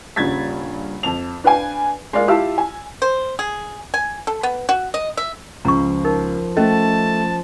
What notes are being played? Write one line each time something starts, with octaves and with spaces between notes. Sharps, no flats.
D#1 G2 C#3 G#6 A6 B6
F2 A5 F7
D4 B4 F5 G5 G#5
G#3 A#3 D5 F5
E4 F4 G4 F5 A5 E6
G#5
C5
G#4
G#5
A4
B3
F#4
D#5
E5
C#2 F3 A#5 C#6
D#4 A#4
A3 C#4 D#5 A5